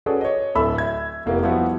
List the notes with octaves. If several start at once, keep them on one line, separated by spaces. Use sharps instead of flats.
C#4 F#4 G#4 A4 B4 D5
C#5 D#5
D1 E4 A4 E5 B5 E6
E5 G#6
F1 A#3 B3 E4 G4
F3 G3 B3 E4 F#4 G4